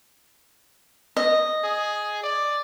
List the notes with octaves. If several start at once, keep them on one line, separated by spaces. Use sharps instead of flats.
D#5
G#4
D5